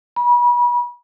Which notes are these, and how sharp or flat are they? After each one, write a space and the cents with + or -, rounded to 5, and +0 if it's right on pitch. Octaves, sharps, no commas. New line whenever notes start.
B5 -35